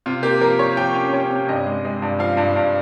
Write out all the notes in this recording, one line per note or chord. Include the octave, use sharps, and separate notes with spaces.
C3 F4
A#3 G4
F3 A#4
F3 C#5
F3 G5
C#4
C#4 C#5
C3
G2 D#5
G#3
G#3
G2
F3 F5
G2
G2